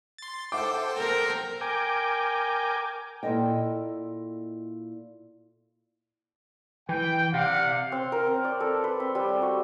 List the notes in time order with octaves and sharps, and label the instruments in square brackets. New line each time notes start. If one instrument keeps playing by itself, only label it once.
[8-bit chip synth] C6 A6
[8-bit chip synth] A4 C5 G5 [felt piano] E5 F#5 D6
[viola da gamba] A#4
[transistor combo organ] A#4 G5 G#5 D6
[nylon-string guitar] A#2 E4 A4 D#5 G5
[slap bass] E3 [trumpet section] G5
[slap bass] C3 [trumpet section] D5 F5 F#5
[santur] C4
A#4
C4
D5
A4
B4
C4
G3
F#4